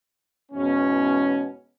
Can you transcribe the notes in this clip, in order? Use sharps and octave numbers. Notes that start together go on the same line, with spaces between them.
E2 G#2 B2 E3 C#4